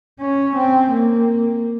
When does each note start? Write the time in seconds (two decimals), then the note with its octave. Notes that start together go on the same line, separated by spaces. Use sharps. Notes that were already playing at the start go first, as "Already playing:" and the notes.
0.19 C#4
0.56 C4
0.92 A#3